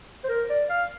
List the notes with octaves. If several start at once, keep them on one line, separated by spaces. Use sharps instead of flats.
C5
A#4
D5
F5